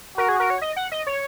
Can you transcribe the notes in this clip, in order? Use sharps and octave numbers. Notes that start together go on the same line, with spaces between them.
F#4 A#4
G#4
A#4
C#5
D#5
F#5
D#5
C#5